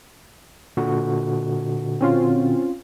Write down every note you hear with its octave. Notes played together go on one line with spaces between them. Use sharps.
A#2 D3 F#4
C4 C#4 F4